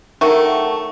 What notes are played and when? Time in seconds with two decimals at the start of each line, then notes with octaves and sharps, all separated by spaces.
0.21 D#3 F#3 A3 C#6